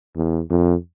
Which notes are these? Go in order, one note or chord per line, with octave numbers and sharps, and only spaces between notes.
E2
F2